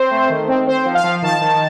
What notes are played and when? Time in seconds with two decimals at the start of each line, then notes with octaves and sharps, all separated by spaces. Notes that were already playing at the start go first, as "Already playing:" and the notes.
Already playing: C4 C5
0.11 A3
0.30 D#3
0.48 C4
0.67 C4 C5
0.85 F3
0.95 F5
1.04 F3
1.22 D#3 A5
1.41 D#3